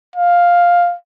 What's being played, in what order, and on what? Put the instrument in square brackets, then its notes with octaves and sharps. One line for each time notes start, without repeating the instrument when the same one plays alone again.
[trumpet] F5